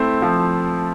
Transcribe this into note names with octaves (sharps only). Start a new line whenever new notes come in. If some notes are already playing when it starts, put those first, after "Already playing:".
Already playing: A3 C4 E4
F3